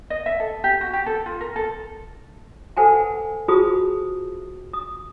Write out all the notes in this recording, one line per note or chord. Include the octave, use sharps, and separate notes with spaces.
D#5
E5
A4
G4
F#4
G4
A4
F4
A#4
A4
A4 B4 C5 F#5 G#5 A5
F#5
F4 F#4 G#4 C5 A5 D#6
D#6